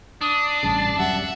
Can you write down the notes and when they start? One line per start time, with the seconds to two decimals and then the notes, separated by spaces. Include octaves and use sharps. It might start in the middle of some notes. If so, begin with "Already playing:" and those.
0.21 D4 D#6
0.63 A1 G2 C#3 A5
0.97 D1 F#2 G3 E5 F#5